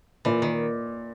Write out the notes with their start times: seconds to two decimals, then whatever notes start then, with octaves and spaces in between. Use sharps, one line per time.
0.25 A#2 E3
0.42 D#3